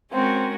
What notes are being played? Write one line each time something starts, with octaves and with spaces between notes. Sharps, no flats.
G#3 C4 C#4 F#4 A#4